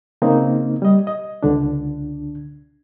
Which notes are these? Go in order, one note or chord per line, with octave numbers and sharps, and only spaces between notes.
C#3 A#3 C4 D#4
G3 D#5
D#5
C#2 D3 D4